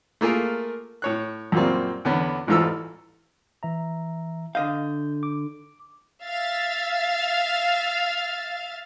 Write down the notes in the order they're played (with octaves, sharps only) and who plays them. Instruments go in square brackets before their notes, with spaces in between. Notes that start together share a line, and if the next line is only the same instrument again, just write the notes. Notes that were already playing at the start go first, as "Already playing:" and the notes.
[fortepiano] A3 A#3 F4 G#4 A#4
A2 C#5 F#6
F#2 A#2 G3 A#3 C4
E2 D3 B3 C#4
A1 E2 G#2 F4 A4 E6
[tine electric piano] E3 E5 A#5
[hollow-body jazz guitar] D3 D#5 F5 [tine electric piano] G6
[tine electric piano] D6
[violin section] E5 F5 A6